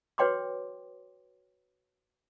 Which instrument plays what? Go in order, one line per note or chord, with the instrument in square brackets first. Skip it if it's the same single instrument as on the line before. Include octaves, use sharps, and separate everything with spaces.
[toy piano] F#4 B4 C#5 G5 C6 D6